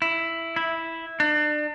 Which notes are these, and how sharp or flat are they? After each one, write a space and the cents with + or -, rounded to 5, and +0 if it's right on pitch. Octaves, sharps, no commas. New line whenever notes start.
E4 +5
E4 -5
D4 +35